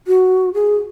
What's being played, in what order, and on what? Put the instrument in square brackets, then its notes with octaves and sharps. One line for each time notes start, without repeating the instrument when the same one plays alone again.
[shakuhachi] F#4
G#4